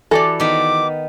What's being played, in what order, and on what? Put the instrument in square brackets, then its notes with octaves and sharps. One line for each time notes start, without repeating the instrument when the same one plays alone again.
[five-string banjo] E3 A4 [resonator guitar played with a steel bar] F#4 G4 D5
[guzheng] D#3 B3 [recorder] D6